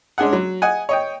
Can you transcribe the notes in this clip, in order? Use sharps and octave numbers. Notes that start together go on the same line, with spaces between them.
G#3 C#4 D4 G#4 F#5
F#3
D#5 F#5 G#5
C#5 D#5 G5